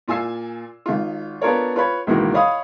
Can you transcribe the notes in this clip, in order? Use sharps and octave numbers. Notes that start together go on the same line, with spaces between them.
A#2 F4 G#5 E6 C7
G#1 F4
B3 D4 F4 A4 A#4 C#5
F4 B4 C#5 B5
C#2 B2 D#3 E3 A#3
C#5 D#5 F5 B5 D#6